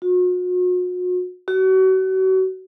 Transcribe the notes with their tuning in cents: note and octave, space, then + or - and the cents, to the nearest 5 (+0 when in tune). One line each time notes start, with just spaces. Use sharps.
F#4 -40
F#4 +35